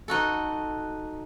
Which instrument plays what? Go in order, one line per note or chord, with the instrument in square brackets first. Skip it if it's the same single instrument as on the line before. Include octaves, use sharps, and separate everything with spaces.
[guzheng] D#4 F#4 A4